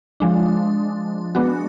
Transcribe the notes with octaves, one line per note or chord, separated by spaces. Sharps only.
F3 G#3 D4
G#3 B3 D4 F#4